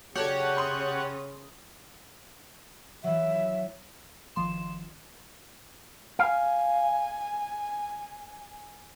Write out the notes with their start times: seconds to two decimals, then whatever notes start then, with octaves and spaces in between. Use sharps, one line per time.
0.15 C#3 F#3 C#4 G4 A4 C#5 D5 F#5
0.57 B5 C6 D#6
3.04 E3 F#3 E5
4.35 G1 D#3 F3 C6 E7
6.19 F5 G#5